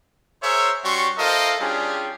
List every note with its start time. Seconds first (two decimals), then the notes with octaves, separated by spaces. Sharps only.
0.43 G#4 A#4 C5 C#5 E5
0.84 G3 C#4 F#4 C6 C#6
1.18 E4 A4 A#4 C5 D#5 F5
1.60 G3 C#4 D4 F4 G4 G#4